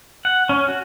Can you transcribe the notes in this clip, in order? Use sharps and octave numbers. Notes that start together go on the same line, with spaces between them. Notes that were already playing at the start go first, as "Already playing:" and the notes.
F#5
C#4
F#4